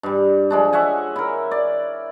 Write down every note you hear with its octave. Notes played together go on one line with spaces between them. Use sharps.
G2 G3
F3 G#3 D4
C#5 E5 F#5 G#5
E4 A#4
D5